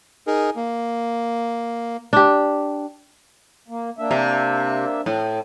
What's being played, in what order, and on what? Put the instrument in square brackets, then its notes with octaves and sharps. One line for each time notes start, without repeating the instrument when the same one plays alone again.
[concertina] D#4 G#4 A#4
A#3
[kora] D4 G4
[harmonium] A#3
A#3 D4 E5
[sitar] C3
A2